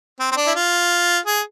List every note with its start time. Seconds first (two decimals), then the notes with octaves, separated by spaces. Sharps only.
0.20 C4
0.32 C4
0.36 D4
0.47 E4
0.55 F4
1.25 G#4